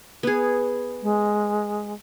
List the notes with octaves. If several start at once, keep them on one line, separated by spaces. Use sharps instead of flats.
B3 G#4
G#3